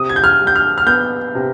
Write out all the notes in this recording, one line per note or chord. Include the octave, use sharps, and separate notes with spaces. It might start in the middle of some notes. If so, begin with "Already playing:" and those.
Already playing: C3 D#6
G#6
G6
F6
G3
G6
F6
F6
B3 G6
C3